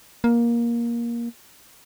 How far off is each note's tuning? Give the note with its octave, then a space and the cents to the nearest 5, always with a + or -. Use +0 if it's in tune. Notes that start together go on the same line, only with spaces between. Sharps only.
A#3 +15